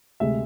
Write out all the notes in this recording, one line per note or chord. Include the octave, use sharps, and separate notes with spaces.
D2 C3 G#3 E5